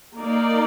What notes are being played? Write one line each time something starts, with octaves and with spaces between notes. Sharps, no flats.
A#3 D#4 A#4 D5